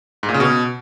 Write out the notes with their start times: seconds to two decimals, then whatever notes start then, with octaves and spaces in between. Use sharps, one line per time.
0.23 G#2
0.29 A#2
0.34 C#3
0.40 B2